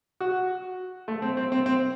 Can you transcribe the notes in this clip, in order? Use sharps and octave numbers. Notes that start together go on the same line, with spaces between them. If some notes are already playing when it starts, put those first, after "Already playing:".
F#4
A3
C4
C4
C4
C4